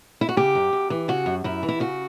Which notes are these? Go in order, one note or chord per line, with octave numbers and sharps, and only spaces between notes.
E4
F#4
C#3 G4
F#2
F#2
E3
C#3 F#4
F#2
F#2 E4
E3
E4
C#3 F#4